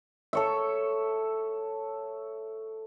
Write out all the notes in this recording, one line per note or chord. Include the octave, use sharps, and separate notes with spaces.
A4 C#5 E5